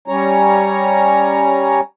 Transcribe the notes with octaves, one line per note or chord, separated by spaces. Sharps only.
G3 C#4 C#5 A#5